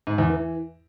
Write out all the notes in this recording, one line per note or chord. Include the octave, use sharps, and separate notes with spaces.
G#2
E2
E3